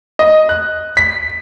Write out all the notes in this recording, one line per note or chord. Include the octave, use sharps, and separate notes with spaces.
D#5
F#6
B6